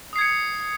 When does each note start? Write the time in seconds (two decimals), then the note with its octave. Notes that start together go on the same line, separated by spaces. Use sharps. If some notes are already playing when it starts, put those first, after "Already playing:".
0.13 D#6
0.16 C7
0.18 G#6
0.21 C#7